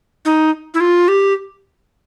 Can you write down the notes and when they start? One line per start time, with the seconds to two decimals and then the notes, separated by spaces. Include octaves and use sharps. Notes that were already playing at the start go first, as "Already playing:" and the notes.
0.25 D#4
0.74 E4
0.80 F4
1.08 G4